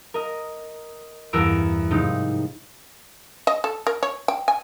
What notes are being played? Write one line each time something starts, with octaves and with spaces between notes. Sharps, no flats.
A#4 D#5
E2 G2 A#4 A#5 E6 D7
G#2 C3 F3 D#4 G4
D#5
A4
A#4
C#5
G5
G#5